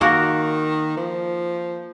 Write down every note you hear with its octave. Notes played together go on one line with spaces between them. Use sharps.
D#3 A#3 F#4 A#4
F3